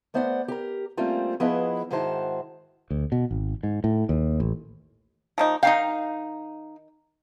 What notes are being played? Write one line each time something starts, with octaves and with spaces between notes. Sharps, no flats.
A3 B3 C5 D5 F5 F#5
G4 A#4
G3 A3 A#3 C4 C#4 F4
F3 B3 E4 G#4 B4 D#5
G#2 D#3 E4 F#4 C5 A5
D2
B2
G#1
G#2
A2
D#2
A1
F3 A#3 D#4
D#3 D#4 F5 G5